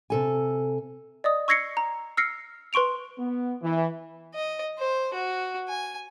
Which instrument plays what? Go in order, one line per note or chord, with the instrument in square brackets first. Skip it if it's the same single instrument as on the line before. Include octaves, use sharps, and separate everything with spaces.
[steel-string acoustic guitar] C3 A4 G#5
[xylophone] D5 D#5 D#6
C#6 E6 G#6 A#6 C7 C#7
A#5
E6 F6 A#6 C7 C#7
B4 C6 C#6 D7 F7
[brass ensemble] B3
E3
[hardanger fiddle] D#5
C5
F#4
G#5